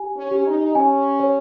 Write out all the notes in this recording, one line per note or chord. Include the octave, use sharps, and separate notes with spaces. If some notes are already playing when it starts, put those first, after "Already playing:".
Already playing: G4 G#5
C#4
G4
D#4
C#4 G#5
C#5